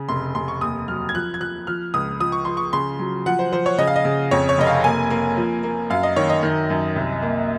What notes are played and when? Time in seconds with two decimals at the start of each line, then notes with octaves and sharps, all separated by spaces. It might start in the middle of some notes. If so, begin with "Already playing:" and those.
Already playing: C#3
0.09 F1 C6
0.35 F1 C6
0.48 C#6
0.61 D#2 D#6
0.88 F#3 F6
1.09 G#6
1.14 F3 F#6
1.34 G#6
1.40 F3 F#6
1.67 F3 F6
1.94 C#2 D#6
2.20 F3 D#6
2.32 C#6
2.45 F3 C6
2.57 C#6
2.73 C#3 C6
2.99 F#3
3.26 F3 F#5
3.39 C5
3.52 F3 C5
3.66 C#5
3.78 C#3 D#5
3.87 F5
3.96 D#5
4.05 C#3
4.31 F2 C#5
4.49 C#5
4.58 F1 D#5
4.67 F5
4.84 A#3 G#5
5.10 A#3
5.37 F3
5.63 A#3
5.90 F#2 F5
6.03 D#5
6.16 D#3 C#5
6.29 D#5
6.43 D#3
6.70 F#2
6.96 C2
7.22 A#3